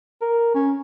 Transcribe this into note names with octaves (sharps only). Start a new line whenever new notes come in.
A#4
C#4